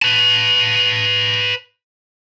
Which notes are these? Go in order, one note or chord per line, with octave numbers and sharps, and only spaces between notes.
B4 A5